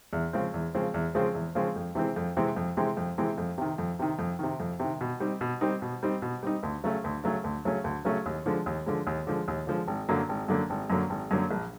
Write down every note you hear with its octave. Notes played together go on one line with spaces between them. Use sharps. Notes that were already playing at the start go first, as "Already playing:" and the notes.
E2
C#3 F3 G#3 C4
E2
C#3 F3 G#3 C4
E2
C#3 F3 G#3 C4
E2
C#3 F3 G#3 C4
F2
C3 E3 G#3 C4
F2
C3 E3 G#3 C4
F2
C3 E3 G#3 C4
F2
C3 E3 G#3 C4
F2
C3 D#3
F2
C3 D#3
F2
C3 D#3
F2
C3 D#3
B2
G3 C4 D#4
B2
G3 C4 D#4
B2
G3 C4 D#4
B2
G3 C4 D#4
D2
C#3 F#3 A3 C#4
D2
C#3 F#3 A3 C#4
D2
C#3 F#3 A3 C#4
D2
C#3 F#3 A3 C#4
D#2
D3 F3 G#3
D#2
D3 F3 G#3
D#2
D3 F3 G#3
D#2
D3 F3 G#3
G#1
F#2 D3 F#3 A#3
G#1
F#2 D3 F#3 A#3
G#1
F#2 D3 F#3 A#3
G#1
F#2 D3 F#3 A#3
A#1